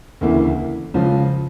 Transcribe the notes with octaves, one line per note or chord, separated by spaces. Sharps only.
D2 C#3 E3 A#3 E4
C#2 C#3 F3 C#4 F4